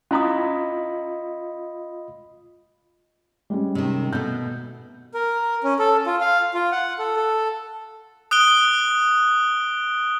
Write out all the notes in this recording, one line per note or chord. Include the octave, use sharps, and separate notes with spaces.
C#4 E4 F4 D#5 B5 D#6
G3 G#3 C#4
C3 D#3
B2 A3 G6
A#4
C#4
A4
F4
F5
F4
F#5
A4
A4
D#6 F#6 D7 G7